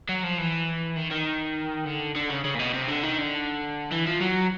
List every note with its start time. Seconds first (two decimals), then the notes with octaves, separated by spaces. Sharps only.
0.09 F#3
0.23 F3
0.38 E3
0.97 D#3
1.12 D#3
1.86 D3
2.15 D3
2.30 C#3
2.44 C#3
2.55 A#2
2.59 B2
2.74 C3
2.88 D3
3.03 D#3
3.18 D3
3.92 E3
4.07 F3
4.22 F#3